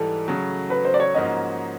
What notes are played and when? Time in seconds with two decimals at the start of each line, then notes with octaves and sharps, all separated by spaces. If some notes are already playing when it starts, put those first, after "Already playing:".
Already playing: G#2 E3 G3 A4
0.27 C#3 F#3 A3
0.70 B4
0.85 C5
0.94 D5
1.00 C#5
1.14 G#2 F3 A#3 C#4 F#4 D#5